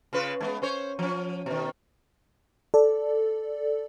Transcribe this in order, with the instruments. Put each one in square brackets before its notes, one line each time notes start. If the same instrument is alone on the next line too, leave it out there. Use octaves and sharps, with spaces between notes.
[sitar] C#3 F4 B4
G#2 G#3 B3
C#4 C5 C#5
F3 C#4
B2 D#3
[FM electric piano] A4 D5